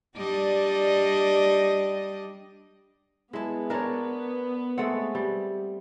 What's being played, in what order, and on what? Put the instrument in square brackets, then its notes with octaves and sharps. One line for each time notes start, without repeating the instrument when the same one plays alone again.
[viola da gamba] G3 D4 D#5
[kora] G#3 [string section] B3 [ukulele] E4 A5
[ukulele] D4 D5 A5 [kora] A#4 C#5
[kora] G#3 A3 C4 [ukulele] F#5
[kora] G3